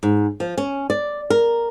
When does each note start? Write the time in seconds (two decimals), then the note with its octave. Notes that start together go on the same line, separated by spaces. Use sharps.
0.03 G#2
0.40 F3
0.58 C#4
0.90 D5
1.30 A#4